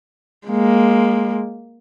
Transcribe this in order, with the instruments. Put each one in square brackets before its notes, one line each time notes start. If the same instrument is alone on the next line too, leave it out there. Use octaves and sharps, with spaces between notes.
[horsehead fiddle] G#3 A#3